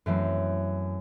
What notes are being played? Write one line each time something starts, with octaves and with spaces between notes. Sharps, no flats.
F#2 E3 A3 C4